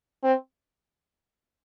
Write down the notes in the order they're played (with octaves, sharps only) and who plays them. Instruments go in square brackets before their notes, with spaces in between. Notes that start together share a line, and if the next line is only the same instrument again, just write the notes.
[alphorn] C4